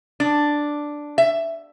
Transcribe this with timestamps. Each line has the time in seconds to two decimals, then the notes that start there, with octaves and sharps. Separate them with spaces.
0.20 D4
1.18 E5